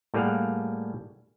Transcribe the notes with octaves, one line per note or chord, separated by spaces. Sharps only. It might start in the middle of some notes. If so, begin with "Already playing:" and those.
A2 G3 A#3 G#4 F5 F#5